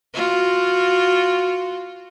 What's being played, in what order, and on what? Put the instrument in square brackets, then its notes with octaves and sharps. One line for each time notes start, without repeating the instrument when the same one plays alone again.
[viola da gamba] F4 F#4